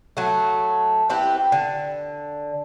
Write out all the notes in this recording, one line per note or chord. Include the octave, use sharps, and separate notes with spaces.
F#3 A3
C4 E4 G4 B4
D3